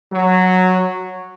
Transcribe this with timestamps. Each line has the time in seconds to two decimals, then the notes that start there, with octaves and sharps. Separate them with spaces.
0.12 F#3